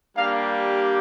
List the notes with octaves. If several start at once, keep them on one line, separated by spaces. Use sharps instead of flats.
G3 A#3 D4 G4 F5